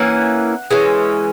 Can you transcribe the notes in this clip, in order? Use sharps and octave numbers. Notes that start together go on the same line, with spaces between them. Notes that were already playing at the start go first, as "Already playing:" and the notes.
Already playing: E3 A#3 C#4 F#5
E3 G#3 C#4